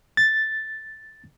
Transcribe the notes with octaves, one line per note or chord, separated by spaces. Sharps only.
A6